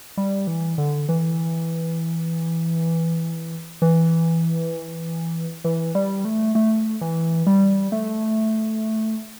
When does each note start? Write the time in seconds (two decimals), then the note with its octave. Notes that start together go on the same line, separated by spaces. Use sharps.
0.17 G3
0.47 E3
0.78 D3
1.09 E3
3.82 E3
5.64 E3
5.95 G3
6.25 A3
6.55 A3
7.01 E3
7.47 G3
7.92 A3